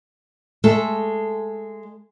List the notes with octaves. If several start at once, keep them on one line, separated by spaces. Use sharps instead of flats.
G#3 A3 A4